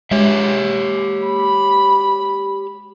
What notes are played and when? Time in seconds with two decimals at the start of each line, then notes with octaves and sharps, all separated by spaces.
0.11 G#3 G4 C#5 E5
1.25 B5